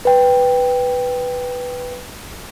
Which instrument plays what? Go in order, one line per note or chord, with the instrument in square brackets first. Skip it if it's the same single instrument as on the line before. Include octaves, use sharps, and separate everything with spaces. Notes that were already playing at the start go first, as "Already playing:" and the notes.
[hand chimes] B4 G5